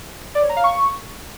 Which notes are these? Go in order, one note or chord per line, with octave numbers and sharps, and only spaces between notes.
D5
C#5
A#5
F5
C#6